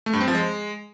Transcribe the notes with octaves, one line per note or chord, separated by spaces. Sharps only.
A3
G2
C4
F3
G#3